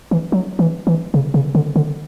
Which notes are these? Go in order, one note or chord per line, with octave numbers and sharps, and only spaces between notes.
E3
F#3
E3
E3
C#3
C#3
D3
D3